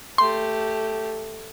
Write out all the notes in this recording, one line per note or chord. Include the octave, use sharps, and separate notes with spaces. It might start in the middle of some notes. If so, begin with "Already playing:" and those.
A3 G4 C6